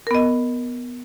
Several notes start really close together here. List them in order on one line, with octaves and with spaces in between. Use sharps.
A#4 B3 D#5